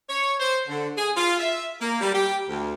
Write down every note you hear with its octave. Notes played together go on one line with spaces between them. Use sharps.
C#5
C5
D3
G#4
F4
E5
A#3
G3
G4
D2